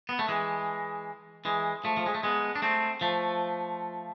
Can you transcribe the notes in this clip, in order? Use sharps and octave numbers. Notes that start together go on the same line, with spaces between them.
B3
A3
E3 G#3
E3 G#3
F3 A3
F3
G#3
A3
G#3 B3
D4
A3 C4
F3 A3